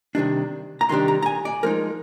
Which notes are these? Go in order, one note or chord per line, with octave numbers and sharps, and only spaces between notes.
C3 D#3 G3 D4
A#5
C3 D#3 G3 D4 C6
A#5
A#5
G#5
D5
F3 G#3 D#4 A#4